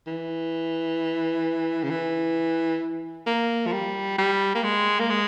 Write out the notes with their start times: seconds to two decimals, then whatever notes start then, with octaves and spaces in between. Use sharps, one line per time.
0.07 E3
1.83 C#3
1.90 E3
3.27 A#3
3.67 F3
3.73 G3
4.18 G3
4.55 A#3
4.64 G#3
4.99 A#3
5.10 G#3